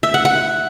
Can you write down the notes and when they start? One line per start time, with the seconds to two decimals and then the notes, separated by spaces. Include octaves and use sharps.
0.03 E5
0.14 F#5
0.25 F#5